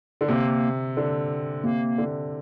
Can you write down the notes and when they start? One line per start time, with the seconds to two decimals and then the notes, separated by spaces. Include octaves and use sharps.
0.21 D3
0.28 C3 A#3
0.97 D3
1.64 C3 A#3
1.98 D3